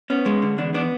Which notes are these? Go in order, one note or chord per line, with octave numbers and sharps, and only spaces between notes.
B3 C#4
G#3
D3
E2 D4
B3 D4